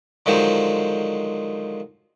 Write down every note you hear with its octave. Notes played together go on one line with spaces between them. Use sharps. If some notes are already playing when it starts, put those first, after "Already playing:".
D3 D#3 F3 F#3 G#3 C5